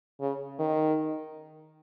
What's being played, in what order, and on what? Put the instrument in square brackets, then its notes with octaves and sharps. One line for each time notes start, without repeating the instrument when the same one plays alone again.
[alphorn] C#3
D#3